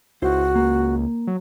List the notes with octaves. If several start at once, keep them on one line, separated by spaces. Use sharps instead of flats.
C#2 E4 F#4 C5
A#3
F#3